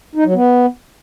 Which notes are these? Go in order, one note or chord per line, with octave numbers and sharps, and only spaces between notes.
D#4
F#3
B3